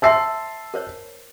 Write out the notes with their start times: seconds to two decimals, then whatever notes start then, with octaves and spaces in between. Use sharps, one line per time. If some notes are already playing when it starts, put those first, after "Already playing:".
0.02 C5 E5 A5 C6 E6 C7
0.74 A#4 C5 C#5